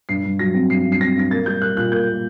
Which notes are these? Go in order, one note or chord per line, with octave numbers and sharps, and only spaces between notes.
G2 C7
G2
F#3 A#6
C4
G2 C7
G2
C7
C4 A#6
G2 A#6
A#3 A6
G3 G6
A#3 F#6
A#2 F#6
A#3 G6
A#3